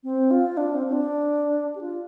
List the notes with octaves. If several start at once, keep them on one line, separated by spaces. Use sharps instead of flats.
C4
F4
D4
C4
C4
D4
G4
F4